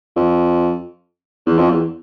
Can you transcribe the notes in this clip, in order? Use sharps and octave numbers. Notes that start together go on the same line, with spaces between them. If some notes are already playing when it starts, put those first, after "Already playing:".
F2
E2
F2
E2